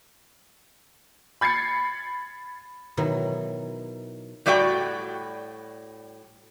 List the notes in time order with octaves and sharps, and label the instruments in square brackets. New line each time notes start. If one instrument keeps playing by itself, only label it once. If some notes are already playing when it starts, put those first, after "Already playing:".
[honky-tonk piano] B5 G#6 A6 C7 C#7
[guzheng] B2 D#3 E3 F#3
[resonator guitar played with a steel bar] A2 G3 F#4 D5 E5 G5